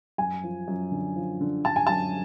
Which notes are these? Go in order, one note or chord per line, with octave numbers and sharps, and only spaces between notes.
F#2 G#5
F3
F#2
D3
F3
D3
D3 A5
G#5
F#2 A5